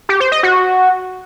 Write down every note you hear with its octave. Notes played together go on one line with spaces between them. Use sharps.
G4
C5
D#5
F#4